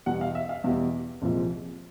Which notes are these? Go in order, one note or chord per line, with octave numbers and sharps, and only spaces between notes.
E2 B2 G3 F#5
F5
E5
F5
E2 B2 G3 E5
C2 A#2 F3 G#3